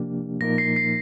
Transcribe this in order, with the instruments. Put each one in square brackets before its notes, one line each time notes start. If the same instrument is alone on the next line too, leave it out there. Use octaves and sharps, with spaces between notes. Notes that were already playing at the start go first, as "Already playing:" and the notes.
Already playing: [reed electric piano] C3 F3 A#3 D4 G4
[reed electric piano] A#2 F3 A#3 D#4 A#4 [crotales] A#6
[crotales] C7
C7